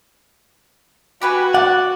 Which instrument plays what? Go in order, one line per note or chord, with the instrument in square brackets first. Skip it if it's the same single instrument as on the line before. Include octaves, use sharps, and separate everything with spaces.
[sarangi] F#4 [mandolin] G4 B4 G#5
[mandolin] D5 [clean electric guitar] F#5